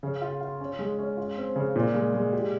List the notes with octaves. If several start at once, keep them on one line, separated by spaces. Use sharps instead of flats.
C#3
F4
F4
C#4
G#3
C#4
F4
C4
C#3
A#2
G#3
G#3
G4